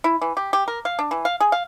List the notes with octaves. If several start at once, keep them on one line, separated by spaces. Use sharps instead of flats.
E4
E3
G4
G4
A#4
F5
D4
E3
F5
G#4
F5